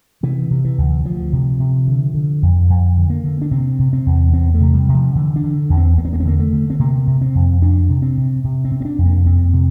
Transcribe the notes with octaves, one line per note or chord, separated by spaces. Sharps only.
C3 E3
C3
E3
D2
D2 F3
C3
C3
D3
D3
F2
F2
D3
A#3
D3
D4
C3 C4
C3
C4
E2
E2 C4
A3
C3
G3
C3
F3
D3 E3
D4
D3
E2
C4
E2 A#3
C4
A#3
C4
D3 A#3
A3
D3
C4
C3 A#3
C3
C4
F2
F2 D4
C3
C4
C3
C3
C4
C3
C4
D4
F2
A#3
F2 C4
C3